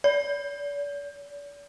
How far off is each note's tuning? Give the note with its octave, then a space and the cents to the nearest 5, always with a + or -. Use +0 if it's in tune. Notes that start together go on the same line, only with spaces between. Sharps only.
D5 -40